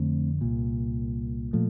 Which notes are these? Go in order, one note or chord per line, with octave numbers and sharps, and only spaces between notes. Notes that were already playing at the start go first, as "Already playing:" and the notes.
Already playing: F2 D3 A3 C4
C2 A#2
A#2 F3 A3